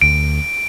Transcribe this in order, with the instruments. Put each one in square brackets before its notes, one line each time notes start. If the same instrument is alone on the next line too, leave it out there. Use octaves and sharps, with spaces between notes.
[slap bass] D2 [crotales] D7